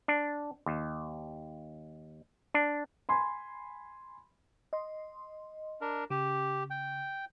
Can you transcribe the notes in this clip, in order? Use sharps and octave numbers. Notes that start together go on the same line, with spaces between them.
D4
D#2
D4
G#5 B5 C6
D#5 C6
D4 A#4
C#3 G4
G5